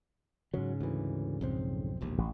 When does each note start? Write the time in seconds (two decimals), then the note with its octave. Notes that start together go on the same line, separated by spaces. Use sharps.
0.54 G#2 C#3 F#3
0.81 D2 E3
1.41 B1 F2 C4
2.01 E1 A#1 D#2
2.18 A1